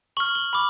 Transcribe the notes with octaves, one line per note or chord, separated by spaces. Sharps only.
C#6 F6 F#7
G7
B5 D6